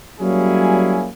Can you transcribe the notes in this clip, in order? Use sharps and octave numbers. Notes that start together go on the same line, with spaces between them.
F#3 G3 A#3 C#4 E4 G#4